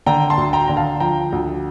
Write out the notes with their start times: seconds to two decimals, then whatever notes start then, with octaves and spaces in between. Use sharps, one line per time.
0.06 D3 G5 A#5
0.30 A5 C6
0.38 D2
0.53 G5 A#5
0.68 D3 A#5
0.77 F5 A5
1.00 F3 G5 A#5
1.32 D2